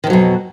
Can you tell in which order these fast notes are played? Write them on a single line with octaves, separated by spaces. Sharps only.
D#3 F2 F#3 B2